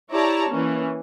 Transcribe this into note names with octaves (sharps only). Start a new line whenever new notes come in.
E4 G4 C#5 D5 A5 A#5
E3 A#3 C#4